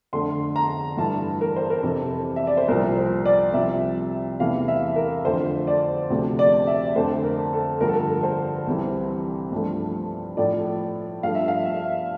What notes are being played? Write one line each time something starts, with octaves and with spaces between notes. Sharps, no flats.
F2 D3 A3 C6
A#5
G2 E3 A3 A5
A#4
C5
A#4
F2 C3 E3 A4
E5
D5
C5
C2 A#2 F3 A#4
C5
D5
C2 C3 F3 E5
E2 C3 E3 A3 F5
E5
A#4
F2 D3 F3 A3 C5
D5
D2 C3 F3 A3
D5
E5
F2 D3 A3 C5
A#4
A4
G2 D3 F3 A3 A#4
A4
A#4
C5
C2 C3 E3
G2 F3 A3
A2 F3 A3 D5
G2 F3 A3 F5
E5
F5
E5